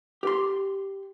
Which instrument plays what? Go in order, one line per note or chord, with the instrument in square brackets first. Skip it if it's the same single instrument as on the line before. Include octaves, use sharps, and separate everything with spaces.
[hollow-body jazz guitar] G4 C6